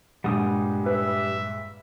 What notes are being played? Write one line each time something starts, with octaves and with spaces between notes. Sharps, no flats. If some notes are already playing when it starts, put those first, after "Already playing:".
G2 A#2 G3 G#3 F#5 D#6 G6
B4 E5